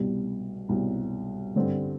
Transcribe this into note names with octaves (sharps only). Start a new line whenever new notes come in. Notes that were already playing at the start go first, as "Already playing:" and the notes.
Already playing: C2 B2 G3
C2 B2 G3
G2 D3 G3 C4